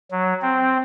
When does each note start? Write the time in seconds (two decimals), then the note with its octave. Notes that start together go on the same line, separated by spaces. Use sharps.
0.11 F#3
0.42 C4